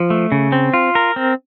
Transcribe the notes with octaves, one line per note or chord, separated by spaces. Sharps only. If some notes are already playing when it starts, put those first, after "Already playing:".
Already playing: F3
A3
C#3
C4
F4
A#4
C4